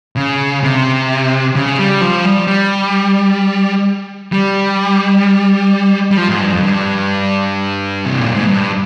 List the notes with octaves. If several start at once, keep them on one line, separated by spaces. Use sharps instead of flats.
C#3
C3
C#3
G3
F3
G3
G3
G3
G3
F3
G#2
G2
F2
G2
C3
A#2
G#2
G2